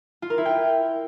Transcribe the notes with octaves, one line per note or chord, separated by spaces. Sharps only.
F4
A#4
E4
G5